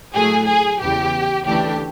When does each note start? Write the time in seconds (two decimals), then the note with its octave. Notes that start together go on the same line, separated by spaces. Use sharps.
0.14 A2 F#3 A3 G#4
0.48 G#4
0.80 E2 C#3 E3 G4
1.46 D2 C#3 E3 A3 D4 G4